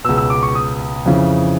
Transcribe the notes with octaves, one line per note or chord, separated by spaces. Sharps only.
C#2 B2 E6
E6
D6
C#6
D#6
F2 C#3 E3